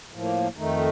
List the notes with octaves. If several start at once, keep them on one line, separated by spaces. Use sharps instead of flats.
A2 F3 A#3
F2 D#3 A3 D#4